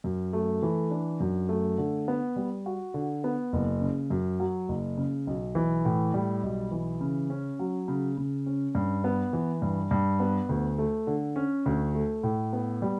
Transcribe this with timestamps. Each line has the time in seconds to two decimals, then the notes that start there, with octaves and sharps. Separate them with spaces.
0.04 F#2
0.33 A3
0.63 E3
0.91 D4
1.20 F#2
1.49 A3
1.78 D3
2.08 B3
2.36 G3
2.66 F#4
2.94 D3
3.24 B3
3.53 F#1
3.81 C#3
4.10 F#2
4.40 F#3
4.69 F#1
4.98 C#3
5.27 B1
5.55 E3
5.85 A2
6.14 G3
6.43 B1
6.71 E3
7.01 C#3
7.30 C#4
7.59 F#3
7.88 C#3
8.18 C#3
8.46 C#4
8.75 G2
9.04 B3
9.33 E3
9.62 G2
9.91 G2
10.20 B3
10.49 D2
10.78 A3
11.07 D3
11.36 C#4
11.66 D2
11.95 A3
12.23 A2
12.53 B3
12.82 G3